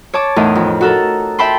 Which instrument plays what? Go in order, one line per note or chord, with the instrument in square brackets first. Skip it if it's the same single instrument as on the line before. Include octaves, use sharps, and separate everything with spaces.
[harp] C#5 A5 D6
E2 A2 D#4 A#4
F2
F#4 A4 A#4
E5 G5 A5 B5 C6